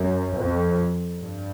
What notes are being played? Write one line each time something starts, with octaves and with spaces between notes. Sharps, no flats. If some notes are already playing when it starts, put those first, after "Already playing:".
Already playing: F#2
F2
G2